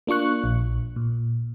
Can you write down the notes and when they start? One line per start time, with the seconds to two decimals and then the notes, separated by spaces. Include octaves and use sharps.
0.07 A#3 D4 F4 C#6 F#6
0.44 A#1
0.96 A#2